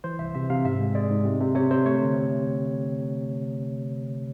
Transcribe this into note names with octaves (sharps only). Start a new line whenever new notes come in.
E3 C5
C2 E5
C3 E5
C3 F5
G#2 E5
G#3
G#3 D5
G#2
C3
C3
C3 C#5
C3 C5
A3 C#5
D3